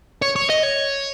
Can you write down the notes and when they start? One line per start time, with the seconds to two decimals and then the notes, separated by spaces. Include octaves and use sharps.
0.22 C#5
0.36 C#5
0.50 D#5
0.63 C#5